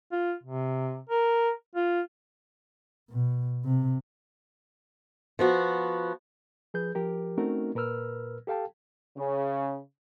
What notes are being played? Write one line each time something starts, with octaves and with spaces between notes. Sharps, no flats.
F4
C3
A#4
F4
B2
C3
F3 B3 F#4
F3 G#4 B4 G6
F3 G4 A#4
A3 C4 C#4 D#4 F#4 A#4
A#2 A#4 B4 E6 F6
G4 A4 F5 G5 A5
C#3